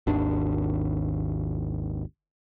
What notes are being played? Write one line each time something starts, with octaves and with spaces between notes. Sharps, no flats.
G#1 D#2 D4